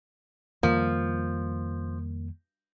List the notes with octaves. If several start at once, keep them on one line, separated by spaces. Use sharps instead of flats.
F2 D#3 F3 G3 A#3